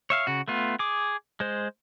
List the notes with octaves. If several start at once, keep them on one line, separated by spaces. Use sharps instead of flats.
C#5 E5 F5
C#3 F#4
A3 B3 F4
G#4 D6
G#3 C5